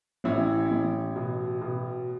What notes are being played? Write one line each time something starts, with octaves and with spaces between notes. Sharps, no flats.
A1 C#4 E4
A1
B2
B2